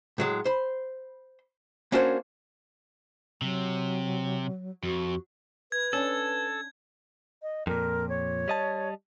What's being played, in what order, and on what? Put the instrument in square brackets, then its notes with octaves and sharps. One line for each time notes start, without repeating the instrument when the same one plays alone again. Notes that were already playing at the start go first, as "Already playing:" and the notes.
[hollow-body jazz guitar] A2 F#3 G#3
C5 B5
A#3 C#4 D4 F#4 A#4 C5
[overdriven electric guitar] C3 [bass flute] F#3
[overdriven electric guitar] F2 [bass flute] F#4
[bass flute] B4 [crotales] G#6
[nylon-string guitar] C#4 D4 [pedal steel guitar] A4
[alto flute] D#5
[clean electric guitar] F2 A#2 [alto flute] A#4
[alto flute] C#5
[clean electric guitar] G3 D#5 A5